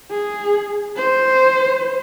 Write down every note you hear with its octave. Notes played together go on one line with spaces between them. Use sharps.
G#4
C5